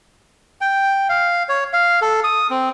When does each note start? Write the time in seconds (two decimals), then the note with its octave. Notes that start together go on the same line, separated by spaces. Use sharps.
0.61 G5
1.09 F5
1.49 C#5
1.73 F5
2.02 A4
2.24 D#6
2.50 C4